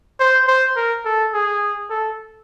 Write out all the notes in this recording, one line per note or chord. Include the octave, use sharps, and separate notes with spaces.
C5
C5
A#4
A4
G#4
A4